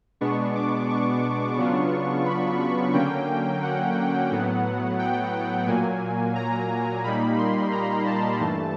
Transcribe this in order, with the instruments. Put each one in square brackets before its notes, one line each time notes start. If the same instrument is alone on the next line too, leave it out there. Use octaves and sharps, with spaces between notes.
[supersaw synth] B2 G#3 B3 D4 C#6
D6
C#6
C#3 F#3 B3 D4 F4
B5
B5
D3 F#3 A#3 C#4 G5
F#5
A2 F#3 B3
G5
A#2 F#3 A#3 G#5
A#5
A#2 G3 A#3 D#4 B5
C6
A#5
A5
G2 E3 A3